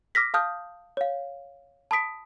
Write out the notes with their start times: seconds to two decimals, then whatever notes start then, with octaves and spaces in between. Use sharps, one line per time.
0.15 D6 F6 A#6 B6
0.34 F5 A5 D#6 F6 G6
0.97 C#5 F5
1.91 A5 B5 D#6 B6 D7